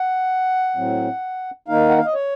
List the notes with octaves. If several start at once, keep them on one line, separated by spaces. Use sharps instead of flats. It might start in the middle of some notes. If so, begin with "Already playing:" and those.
Already playing: F#5
A2 F#3 C4
D#3 A#3 D#4 F5
F#5
F5
D#5
C#5